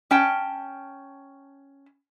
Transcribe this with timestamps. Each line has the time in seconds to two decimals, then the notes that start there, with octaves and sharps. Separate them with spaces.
0.11 C#4 G5 A5